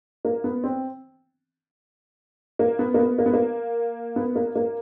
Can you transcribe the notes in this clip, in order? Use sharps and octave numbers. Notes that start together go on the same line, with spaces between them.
A#3
B3
C4
A#3
B3
A#3
B3
A#3
B3
A#3
B3
A#3
A#3